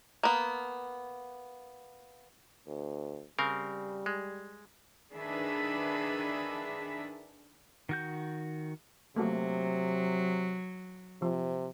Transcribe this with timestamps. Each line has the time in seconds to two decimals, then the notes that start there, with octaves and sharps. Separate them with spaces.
0.23 A#3 B3
2.67 D2
3.39 C#3 G3 C4 A#4
4.06 G#3
5.12 D#3 D4 G#4 B4 E5
7.89 D#3 F#4 G6
9.16 C3 F#3 A3 A#3 F#4
11.22 C3 F3